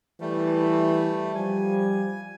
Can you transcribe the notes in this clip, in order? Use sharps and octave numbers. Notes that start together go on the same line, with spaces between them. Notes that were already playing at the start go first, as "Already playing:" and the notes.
E3 G3 A3
F3 G3 G#5